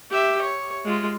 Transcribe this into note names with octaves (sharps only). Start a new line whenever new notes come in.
G4 E5
C#5
G#3 F4